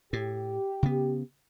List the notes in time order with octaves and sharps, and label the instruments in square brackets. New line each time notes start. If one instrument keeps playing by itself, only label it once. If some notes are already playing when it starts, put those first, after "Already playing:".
[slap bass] A2 [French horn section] G4
[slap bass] C#3 B3